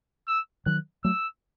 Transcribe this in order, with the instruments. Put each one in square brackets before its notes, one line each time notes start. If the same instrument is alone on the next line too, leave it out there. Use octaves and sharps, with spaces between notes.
[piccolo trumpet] E6
[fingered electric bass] D#3 F#3 [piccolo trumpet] F#6
[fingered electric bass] F#3 A3 [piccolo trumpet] E6